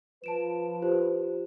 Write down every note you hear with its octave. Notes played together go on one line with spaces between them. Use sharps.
F3 B4 A5 D7 E7
F4 G4 C5